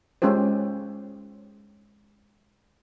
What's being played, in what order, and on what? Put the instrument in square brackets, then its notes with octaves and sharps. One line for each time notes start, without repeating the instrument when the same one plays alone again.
[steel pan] G#3 C#4 F4 G4 C5